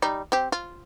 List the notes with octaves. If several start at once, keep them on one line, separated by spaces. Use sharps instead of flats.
G3 D#4
C4 G4
F4